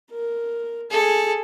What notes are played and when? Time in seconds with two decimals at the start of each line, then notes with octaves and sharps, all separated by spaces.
0.11 A#4
0.91 G#4 A4